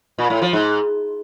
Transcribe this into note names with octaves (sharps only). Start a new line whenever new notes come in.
A#2
A2
F3
G#2